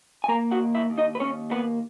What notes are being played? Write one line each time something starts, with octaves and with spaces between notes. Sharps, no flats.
G#5
A#3 A#4 A#5
F#4 F#5
D#2
E4 E5
D#2
D#4 D#5
B4
D#2 C#4 C#5
A#3 B3 B4